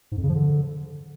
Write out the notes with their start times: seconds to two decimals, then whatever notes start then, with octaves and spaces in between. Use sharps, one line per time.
0.12 G#2
0.17 F2
0.23 C#3
0.29 F3
0.35 D3